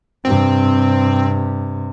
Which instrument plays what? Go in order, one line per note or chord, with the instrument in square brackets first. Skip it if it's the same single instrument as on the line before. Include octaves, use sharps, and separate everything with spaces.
[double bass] G2 C3 [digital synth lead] C4